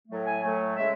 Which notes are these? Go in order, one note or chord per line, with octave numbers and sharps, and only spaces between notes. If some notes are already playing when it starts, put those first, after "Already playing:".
A2 F#3 A3
G#5
A2 F#3 A3
C#3 G#3 E5